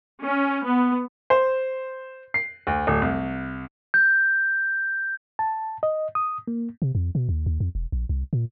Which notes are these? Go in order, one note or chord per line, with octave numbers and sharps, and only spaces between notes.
C#4
B3
C5
C7
D2
D1
C2
G6
A5
D#5
D#6
A#3
C3
F2
B2
D#2
D#2
F2
E1
A#1
C2
A#2